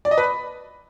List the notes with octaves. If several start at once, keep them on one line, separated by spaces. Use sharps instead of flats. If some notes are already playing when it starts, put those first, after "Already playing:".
D5
D#5
B4
B5